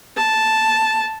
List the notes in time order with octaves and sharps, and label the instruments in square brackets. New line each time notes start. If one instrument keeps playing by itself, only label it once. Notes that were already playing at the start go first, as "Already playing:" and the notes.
[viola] A5